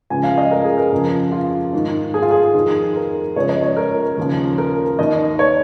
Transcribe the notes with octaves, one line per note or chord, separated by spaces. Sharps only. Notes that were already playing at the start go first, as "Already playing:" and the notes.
C#2 C#3 F3 G#5
F5
D#5
A#4
G#4
A#4
F2 C#3 F3
F4
G#2 D#3
G#4
F4
G#4
F2 D#3
A#4
C#2 C#3 F3 C#5
D#5
C#5
A#4
D#2 C#3 F3
A#4
D#2 D#3 D#5
C#5